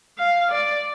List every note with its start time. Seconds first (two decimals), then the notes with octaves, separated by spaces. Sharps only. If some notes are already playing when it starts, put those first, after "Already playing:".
0.18 F5
0.52 D5